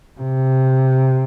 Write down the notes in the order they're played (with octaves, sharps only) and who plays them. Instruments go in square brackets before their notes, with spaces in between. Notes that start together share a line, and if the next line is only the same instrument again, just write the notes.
[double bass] C3